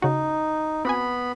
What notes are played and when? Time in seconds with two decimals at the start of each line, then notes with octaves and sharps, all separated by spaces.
0.02 C#3 D#4 F#4
0.85 B3 C4 F#4 G#5 B5